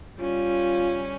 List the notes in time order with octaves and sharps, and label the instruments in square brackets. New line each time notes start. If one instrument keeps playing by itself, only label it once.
[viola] G3 C#4 [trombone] F4